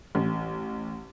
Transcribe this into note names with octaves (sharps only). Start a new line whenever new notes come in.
A1